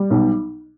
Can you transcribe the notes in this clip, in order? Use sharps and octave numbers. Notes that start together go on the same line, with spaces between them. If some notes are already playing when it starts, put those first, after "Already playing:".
Already playing: G3
B1